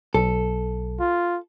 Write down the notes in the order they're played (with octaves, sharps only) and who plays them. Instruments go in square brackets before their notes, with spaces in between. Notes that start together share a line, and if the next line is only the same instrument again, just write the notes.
[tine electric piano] B1 [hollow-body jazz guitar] A4
[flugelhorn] F4